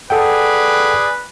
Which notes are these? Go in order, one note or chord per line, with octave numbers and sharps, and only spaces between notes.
G#4 A4 B4 D5 F#5 G5